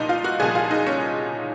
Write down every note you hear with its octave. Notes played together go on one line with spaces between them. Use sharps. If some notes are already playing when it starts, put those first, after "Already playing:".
Already playing: C2 A#2 F3 D#4
F4
F#4
C2 A#2 F3 G#4
F4
D#4
C#4